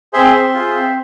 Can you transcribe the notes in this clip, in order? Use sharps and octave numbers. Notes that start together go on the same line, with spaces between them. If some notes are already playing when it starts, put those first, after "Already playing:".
C4 G#4 C5 E5
C4
F4 G#4
C4